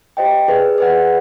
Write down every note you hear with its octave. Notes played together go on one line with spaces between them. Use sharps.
G4 C5 D#5 G5
G#4 B4 D5
G#4 B4 D5 F#5